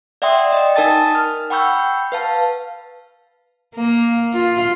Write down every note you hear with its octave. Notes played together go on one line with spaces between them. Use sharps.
D5 E5 F#5 G5 C6 D#6
D#5 G5
D#4 A#4 G#5 A5 D#6 A6
F6
F#5 G5 B5 C#6 E6 G6
B4 F5 A5
A#3
F4